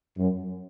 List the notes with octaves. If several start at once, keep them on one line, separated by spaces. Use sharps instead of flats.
F#2